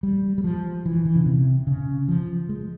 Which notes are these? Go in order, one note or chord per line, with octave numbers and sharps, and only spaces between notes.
G3
G3
F3
E3
E3
C#3
C3
C#3
F3
G#3